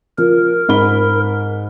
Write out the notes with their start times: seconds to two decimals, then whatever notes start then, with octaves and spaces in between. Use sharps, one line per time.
0.18 F3 A#4
0.69 G#2 B5 G7